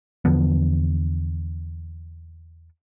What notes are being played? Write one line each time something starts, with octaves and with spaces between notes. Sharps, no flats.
E2 D3 F3 B3